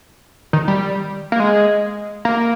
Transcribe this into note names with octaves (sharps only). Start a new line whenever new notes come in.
D#3
G3
A#3
G#3
A#3